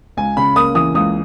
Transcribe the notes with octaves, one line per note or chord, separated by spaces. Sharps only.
C#2 G#5
C#3 B5
A#3 D#6
E3 D#6
C#2 D#6